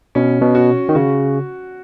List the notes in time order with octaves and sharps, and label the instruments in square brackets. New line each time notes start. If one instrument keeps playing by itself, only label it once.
[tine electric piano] B2 [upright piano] C#4
[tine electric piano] B2
[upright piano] F#4
[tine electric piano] D#3
[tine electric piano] C#3 [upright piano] F#4